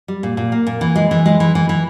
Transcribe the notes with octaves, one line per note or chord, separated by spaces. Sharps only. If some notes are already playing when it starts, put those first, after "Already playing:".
G3
A#2
A#2
A#3
A#2
E3
G#3
E3
G#3
E3
E3
E3